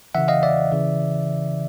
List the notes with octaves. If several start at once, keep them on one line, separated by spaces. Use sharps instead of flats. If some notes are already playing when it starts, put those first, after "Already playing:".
C#3 E3 E5 F#5
D#5 F5
D5 E5
C#3 E3